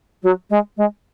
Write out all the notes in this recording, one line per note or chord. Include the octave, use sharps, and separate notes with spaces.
F#3
G#3
G#3